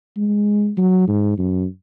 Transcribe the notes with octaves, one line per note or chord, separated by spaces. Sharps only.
G#3
F#3
G#2
F#2